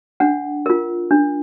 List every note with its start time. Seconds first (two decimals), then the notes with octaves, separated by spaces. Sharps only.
0.20 D4 F#5
0.66 F4 A#4
1.11 D4